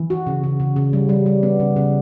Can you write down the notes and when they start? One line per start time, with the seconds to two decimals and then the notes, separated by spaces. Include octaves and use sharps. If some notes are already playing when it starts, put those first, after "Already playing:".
Already playing: E3
0.10 F#4
0.27 C#3
0.44 C#3
0.60 C#3
0.76 C#3
0.93 G3
1.09 G3
1.26 G3
1.43 B3
1.60 C#3
1.76 C#3